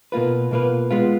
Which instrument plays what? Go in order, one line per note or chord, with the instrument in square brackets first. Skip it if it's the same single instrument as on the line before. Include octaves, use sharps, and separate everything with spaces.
[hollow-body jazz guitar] B2 A#3 F4 B4
B2 A#3 F4 B4
G#3 B3 F4